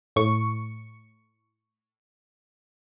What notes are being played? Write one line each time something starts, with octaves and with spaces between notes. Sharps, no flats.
A2 C#6